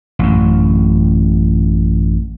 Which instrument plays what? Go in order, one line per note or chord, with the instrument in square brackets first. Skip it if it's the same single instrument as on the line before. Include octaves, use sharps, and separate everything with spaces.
[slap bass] A1 F#2